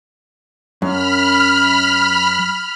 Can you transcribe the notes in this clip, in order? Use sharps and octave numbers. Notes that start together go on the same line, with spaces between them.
F#2 B5 F6